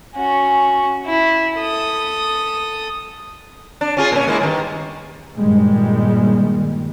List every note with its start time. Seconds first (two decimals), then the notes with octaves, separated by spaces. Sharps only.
0.16 C#4 F#4
1.06 E4
1.57 A4 D#6
3.81 D4
3.97 C#4 F4 G#4
4.12 A#2 C#4
4.27 G#3 A#3 E4
4.41 G2 D#3
5.37 G2 A#2 D#3 G3 G#3